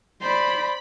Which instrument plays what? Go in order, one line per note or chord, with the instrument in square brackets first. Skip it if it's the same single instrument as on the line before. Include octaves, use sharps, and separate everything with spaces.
[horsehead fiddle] C5 D5 [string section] B5